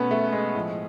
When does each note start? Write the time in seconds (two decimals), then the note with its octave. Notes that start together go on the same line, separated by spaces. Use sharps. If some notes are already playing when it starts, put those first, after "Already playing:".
Already playing: B2 A3 B3 C#4
0.11 A3
0.33 G#3
0.55 A2 F3